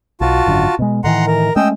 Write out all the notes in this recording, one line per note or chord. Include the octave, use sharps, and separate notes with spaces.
B1 F4 F#4 A5
G#1 F#2 D3
B2 G#3
A2 D#3 E3 F#5 A#5 C6
A#4
G#3 A3 C#4 D#5 G5 E6